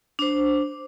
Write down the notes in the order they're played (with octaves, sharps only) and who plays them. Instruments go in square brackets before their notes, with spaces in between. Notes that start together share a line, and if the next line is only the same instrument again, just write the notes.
[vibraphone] D4 C5